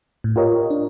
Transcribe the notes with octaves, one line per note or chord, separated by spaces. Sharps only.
A2
F4 G4 A#4 C#5 D#5
D4